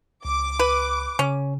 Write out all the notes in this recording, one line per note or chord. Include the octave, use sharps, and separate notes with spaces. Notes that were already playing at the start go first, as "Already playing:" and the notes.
C#2 D6
B4
C#3 C#4